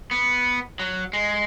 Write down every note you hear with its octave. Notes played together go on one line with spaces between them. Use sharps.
B3
F#3
G#3